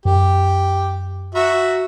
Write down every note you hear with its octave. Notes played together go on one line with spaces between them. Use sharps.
F#2 G4
F#4 E5 A#5